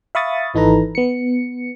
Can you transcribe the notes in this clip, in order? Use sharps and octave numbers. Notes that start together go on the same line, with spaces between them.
E5 F5 B5 C#6 D#6 A6
G#1 E3 D#4 A4 B4 A#5
B3 C#7